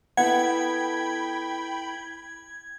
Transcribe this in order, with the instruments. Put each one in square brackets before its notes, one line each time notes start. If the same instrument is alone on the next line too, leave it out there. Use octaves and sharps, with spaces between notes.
[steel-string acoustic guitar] B3 E4 A4 [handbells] F#5 [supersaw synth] G5 B5 [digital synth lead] G#6